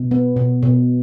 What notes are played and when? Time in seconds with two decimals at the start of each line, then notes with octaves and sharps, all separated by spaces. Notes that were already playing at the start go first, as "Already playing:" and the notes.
Already playing: B2
0.11 B3
0.37 B2
0.63 B2